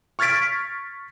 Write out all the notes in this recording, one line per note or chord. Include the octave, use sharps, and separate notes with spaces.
C#6 F6 G#6 A6 B6 D7